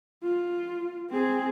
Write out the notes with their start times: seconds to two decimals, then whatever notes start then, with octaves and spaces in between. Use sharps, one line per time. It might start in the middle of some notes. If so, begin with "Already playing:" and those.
0.23 F4
1.10 C4 G#4